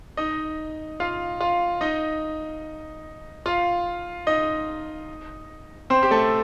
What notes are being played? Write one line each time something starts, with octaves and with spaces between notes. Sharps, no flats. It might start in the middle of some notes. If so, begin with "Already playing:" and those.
D#4 D#5
F4 F5
F4 F5
D#4 D#5
F4 F5
D#4 D#5
C4 C5
G4
A3 A4